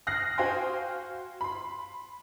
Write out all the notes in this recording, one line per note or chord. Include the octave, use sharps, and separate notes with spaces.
D#6 F6 F#6 A#6 C7
F#4 C5 F5 G5 G#5 C6
B5 C6